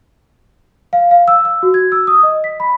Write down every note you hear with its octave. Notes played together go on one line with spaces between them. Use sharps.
F5
F5
E6
E6
F#4
G#6
E6
D#6
D#5
B6
B5